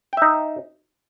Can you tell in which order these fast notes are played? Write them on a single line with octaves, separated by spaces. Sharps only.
G5 E5 D#4